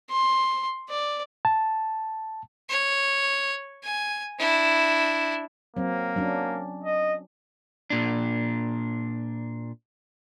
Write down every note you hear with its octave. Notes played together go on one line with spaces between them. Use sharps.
C6
D5
A5
C#5
G#5
D4 E4
F#3 A#3 C4
F#3 C#4 D4
D#5
A#2 D4